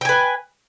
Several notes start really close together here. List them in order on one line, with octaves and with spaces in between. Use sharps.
G5 G#5 B4